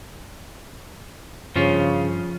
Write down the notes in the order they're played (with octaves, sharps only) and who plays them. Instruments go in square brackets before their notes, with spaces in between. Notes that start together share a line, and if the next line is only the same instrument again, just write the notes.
[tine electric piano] G2 [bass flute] C#3 [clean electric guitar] F3 C#4 F4